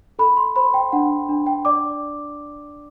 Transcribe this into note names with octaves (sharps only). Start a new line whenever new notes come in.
A4 B5
C6
C5 B5
G5
D4 F#5
D4
G5
D5 D6